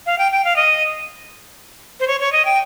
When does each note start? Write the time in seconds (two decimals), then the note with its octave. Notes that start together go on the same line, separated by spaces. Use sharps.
0.06 F5
0.18 G5
0.32 G5
0.45 F5
0.56 D#5
2.00 C5
2.08 C#5
2.20 C#5
2.32 D#5
2.45 G5